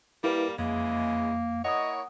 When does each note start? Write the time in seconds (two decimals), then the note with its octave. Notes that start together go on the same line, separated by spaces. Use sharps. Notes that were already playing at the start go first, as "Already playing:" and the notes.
0.24 G3 A#3 E4 B4
0.59 F2 C#3 E3 G#3 A#3
1.65 A#3 E4 C#5 D#5 F#5 D#6